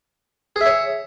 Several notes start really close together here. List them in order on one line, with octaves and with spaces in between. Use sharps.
G#4 E5 C#5